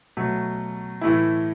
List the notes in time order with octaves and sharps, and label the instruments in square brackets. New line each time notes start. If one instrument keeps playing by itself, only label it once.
[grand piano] B2 F#3 A3
A2 E3 A3 E4